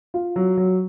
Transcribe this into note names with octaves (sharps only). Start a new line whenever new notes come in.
F4
F#3
F#3